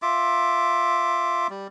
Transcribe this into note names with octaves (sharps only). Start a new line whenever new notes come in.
F4 E5 D6
G3